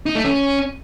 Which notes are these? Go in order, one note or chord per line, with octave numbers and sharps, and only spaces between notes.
D#4
A3
C#4